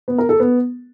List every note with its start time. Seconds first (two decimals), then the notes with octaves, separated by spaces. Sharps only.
0.08 B3
0.18 A#4
0.29 A4
0.40 B3